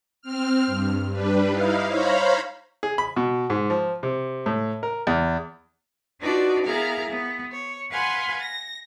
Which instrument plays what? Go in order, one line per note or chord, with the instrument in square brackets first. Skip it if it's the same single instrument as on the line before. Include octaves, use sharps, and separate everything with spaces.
[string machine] C4 F6
G2
G3 D4 B4
D#4 E4 F5
C5 C#5 F5 A#5 B5
[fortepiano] G#4
B5
B2
G#2
F3
C3
A2
A#4
E2
[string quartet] D4 D#4 F4 F#4 B4 D5
B3 E4 G#4 A#4 F5 A#5
B3
C#5
B4 F5 F#5 G#5 B5 C6
A#6